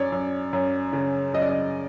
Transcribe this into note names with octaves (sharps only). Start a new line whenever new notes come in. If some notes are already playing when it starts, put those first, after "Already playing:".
Already playing: F#2 C#5 D5
F#2
F#2
C#3
F#2 D#5
D5
D#5